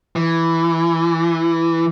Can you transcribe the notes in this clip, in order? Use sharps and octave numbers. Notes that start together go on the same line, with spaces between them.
E3